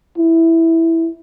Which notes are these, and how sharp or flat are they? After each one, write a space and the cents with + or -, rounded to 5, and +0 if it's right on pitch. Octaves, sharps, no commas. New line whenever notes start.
E4 -5